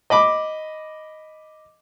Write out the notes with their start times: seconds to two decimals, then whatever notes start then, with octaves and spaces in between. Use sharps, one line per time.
0.10 D#5 B5 D6